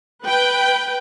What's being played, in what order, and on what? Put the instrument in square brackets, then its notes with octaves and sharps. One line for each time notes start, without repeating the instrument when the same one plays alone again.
[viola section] B4 G5